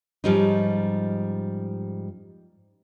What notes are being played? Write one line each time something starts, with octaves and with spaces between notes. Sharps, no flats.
G#2 F3 G3 C#4 D#4